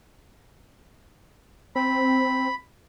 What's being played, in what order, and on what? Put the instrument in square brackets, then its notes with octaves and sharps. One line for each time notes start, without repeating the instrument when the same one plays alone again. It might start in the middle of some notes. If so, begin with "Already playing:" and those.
[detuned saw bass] C4 [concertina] B5